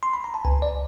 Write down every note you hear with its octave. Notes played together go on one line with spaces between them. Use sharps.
C6
B5
A#5
A5
C#2 G#5
D5